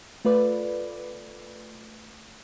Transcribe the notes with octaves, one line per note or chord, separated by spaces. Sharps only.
A3 F4 B4 D5